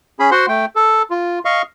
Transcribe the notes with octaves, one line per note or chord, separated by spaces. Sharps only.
C#4 G#4 B5
F#4 C5 F#5 C6
A3 G5
A4
F4
D#5 F5 C#6